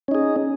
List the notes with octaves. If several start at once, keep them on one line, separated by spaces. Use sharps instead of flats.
C#4 D#4 G#4